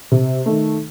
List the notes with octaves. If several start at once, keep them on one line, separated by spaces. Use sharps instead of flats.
C3
D#3 A3